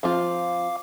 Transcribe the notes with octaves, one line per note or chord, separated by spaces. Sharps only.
F3 C4 F4 F5 D6